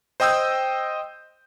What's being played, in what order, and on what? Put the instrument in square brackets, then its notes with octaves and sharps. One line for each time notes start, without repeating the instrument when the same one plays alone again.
[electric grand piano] C5 D#5 G5 D#6 E6 G6